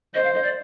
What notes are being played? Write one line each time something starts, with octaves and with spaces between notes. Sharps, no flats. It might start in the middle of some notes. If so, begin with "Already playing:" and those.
C5 D#5
F5
D#5
D5